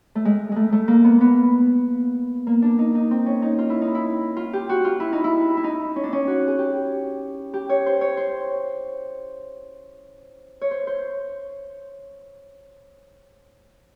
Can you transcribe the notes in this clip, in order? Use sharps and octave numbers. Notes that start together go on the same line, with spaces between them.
A3
G#3
G#3 A3
A3
A#3
B3
B3
A#3
D4
D#4
D#4
C4
C#4
D#4
F4
E4
D#4
E4
F4
G4
F#4
F4
E4
D#4
E4
E4
D#4
C#4
D4
C#4
F#4
G#4
G4
G4
C#5
C5
C#5
C5
C#5
C5
C5